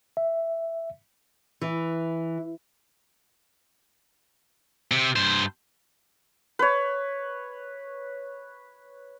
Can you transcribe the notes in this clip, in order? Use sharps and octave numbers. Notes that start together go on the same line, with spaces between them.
E5
E3
C3
G2 C5
B4 C#5